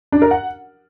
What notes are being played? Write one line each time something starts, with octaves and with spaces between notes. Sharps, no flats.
D4
A#4
F#5